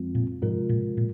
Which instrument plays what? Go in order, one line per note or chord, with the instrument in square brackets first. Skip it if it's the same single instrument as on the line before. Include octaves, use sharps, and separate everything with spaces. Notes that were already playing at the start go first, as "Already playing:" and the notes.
Already playing: [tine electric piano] F2 F3 G#3 C4 F4
[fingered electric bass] A#2
[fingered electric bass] G#2 [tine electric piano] C3 F3 G#3 F4 A#4
[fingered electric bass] A#2
A#2